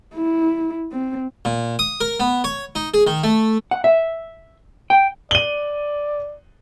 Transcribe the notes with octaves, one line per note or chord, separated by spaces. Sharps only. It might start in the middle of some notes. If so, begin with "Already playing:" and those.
E4
C4
A#2
D#6
A#4
B3
C#5
D#4
G#4
D#3
A3
F#5
E5
G5
D5 D#7 F#7 G7